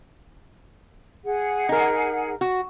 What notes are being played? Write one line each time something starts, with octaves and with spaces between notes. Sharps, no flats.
G#4 F#5
D#4 A#4
F#4